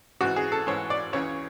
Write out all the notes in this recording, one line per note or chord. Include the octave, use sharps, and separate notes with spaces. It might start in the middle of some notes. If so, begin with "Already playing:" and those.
G#2 E3 F#4
G#4
A4
G#2 E3 C#5
D5
C#2 C#3 E3 C#5